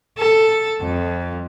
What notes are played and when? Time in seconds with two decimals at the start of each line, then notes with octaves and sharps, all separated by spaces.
0.18 A4
0.82 F2